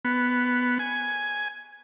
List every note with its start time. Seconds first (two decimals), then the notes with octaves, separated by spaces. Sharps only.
0.05 B3
0.79 G#5